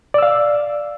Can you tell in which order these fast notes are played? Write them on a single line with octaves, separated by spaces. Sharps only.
D5 E6 F5